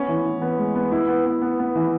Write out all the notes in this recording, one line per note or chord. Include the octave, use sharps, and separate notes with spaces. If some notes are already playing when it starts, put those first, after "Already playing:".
Already playing: B3 C#4
E3
E3
B3
G#3
B3
B3 E4
B3
B3
B3
B3
E3